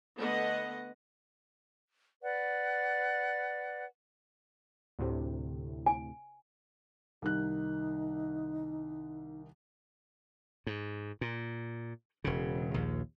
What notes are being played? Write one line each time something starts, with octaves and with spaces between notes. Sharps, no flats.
D3 A3 B3 D#5 F#5
B4 D5 F#5
D2 A2 C3
G#5
C2 D#3 D#4 F#6
G#2
A#2
E1 C#3
A#1 D#2